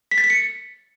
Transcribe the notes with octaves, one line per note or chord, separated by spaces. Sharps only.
B6
A6
B6
C#7